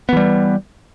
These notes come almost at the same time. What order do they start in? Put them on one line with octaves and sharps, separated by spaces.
B3 E3 G3